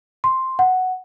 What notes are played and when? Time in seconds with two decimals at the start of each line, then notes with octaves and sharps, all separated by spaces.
0.24 C6
0.59 F#5